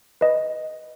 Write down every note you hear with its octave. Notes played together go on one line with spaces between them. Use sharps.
B4 D#5